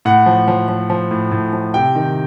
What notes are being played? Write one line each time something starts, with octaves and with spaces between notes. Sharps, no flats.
A2 F#5
F3
F3
F3
F3
A2
A2
F3
C3 G5
D#3